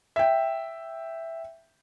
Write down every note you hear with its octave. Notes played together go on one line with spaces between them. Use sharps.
E5 G5